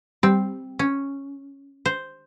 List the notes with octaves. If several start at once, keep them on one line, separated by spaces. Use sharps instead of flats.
G3 C4
C#4
C5